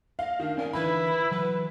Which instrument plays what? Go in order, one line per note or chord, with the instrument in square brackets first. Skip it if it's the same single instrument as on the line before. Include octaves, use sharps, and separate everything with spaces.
[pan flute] D#5 [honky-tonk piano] F5
[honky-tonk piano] D#3 [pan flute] D4
[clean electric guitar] C#4 D5 G#5 [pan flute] A#4
[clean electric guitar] D3 E3 [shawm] E4 [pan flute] B4 [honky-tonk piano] B5
[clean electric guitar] E3 F#3 [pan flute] B4